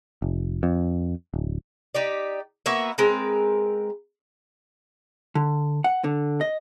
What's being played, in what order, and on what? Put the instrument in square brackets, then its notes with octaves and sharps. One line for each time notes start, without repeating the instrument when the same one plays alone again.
[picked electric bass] F1
F2
D1
[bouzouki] D#4 G4 D5
A#3 B3 F#4 E5
G#3 C4 A#4 B4
[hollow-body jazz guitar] D3
F#5
D3
D#5